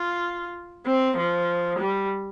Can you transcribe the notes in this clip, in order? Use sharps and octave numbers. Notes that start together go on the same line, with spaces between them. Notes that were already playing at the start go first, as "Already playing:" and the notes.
Already playing: F4
C4
F3
G3